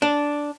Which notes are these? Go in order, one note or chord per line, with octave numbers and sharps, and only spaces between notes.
D4